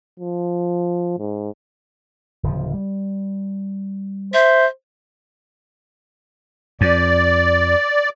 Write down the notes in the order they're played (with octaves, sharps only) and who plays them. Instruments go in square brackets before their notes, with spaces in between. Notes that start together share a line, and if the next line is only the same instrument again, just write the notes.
[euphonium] F3
G#2
[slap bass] D1 C#3 F3
G3
[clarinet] C5 [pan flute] E5
[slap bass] F2 [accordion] D5